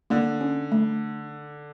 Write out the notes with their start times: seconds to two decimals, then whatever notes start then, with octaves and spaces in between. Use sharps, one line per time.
0.10 D3 A#3
0.41 C#4
0.72 A3